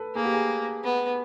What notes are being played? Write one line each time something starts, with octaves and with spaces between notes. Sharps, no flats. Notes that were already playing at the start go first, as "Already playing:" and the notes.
Already playing: A4 B4
A#3 G#4
G4
G#4
B3